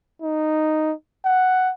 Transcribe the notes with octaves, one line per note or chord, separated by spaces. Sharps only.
D#4
F#5